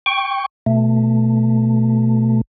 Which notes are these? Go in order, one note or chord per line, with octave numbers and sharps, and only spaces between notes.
G5 C#6
B2 A3